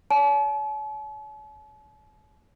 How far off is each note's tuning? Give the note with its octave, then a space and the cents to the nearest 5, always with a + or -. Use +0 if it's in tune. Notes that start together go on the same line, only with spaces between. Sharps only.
C#5 +45 A5 -45